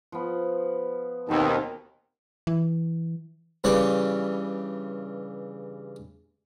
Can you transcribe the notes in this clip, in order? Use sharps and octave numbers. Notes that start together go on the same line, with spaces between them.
F3 B3
D#2 B2 D#3 C4 G#4 A5
E3
G2 C#3 E3 C#5 D5